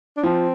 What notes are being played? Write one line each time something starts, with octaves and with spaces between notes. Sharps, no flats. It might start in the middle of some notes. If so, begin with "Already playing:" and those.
D4
F3 C4